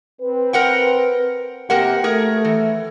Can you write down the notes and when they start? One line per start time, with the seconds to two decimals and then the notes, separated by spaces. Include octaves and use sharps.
0.21 C4 B4
0.53 A#4 F#5 G5
1.70 E2 C3 A#3 G4 A#4 F#5
2.04 A3 G#4 A#4
2.45 E3